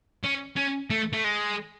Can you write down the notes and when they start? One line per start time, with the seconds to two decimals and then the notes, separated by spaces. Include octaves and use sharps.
0.24 C#4
0.57 C#4
0.90 A3
1.13 A3
1.24 G#3